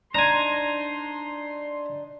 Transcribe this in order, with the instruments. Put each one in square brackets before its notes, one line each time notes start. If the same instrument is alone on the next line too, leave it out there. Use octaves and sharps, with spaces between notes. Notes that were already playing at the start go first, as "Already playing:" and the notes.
[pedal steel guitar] D4 D#4 C5 [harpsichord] G#5 A#5 [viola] C6